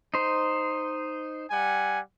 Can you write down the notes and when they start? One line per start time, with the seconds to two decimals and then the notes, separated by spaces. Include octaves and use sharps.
0.14 D#4 C5
1.51 G3 F#5 G#5